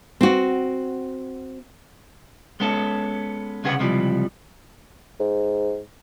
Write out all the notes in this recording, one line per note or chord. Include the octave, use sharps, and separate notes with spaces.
C4 F#4
G#3 B3 C#4 A4
C2 C#3 C#4 G#4 B4 F#5
C#2 C3 E3 F3 G3
G#2